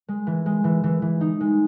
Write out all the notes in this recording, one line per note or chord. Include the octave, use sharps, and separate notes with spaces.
G#3
E3
G#3
E3
E3
E3
D#4
G#3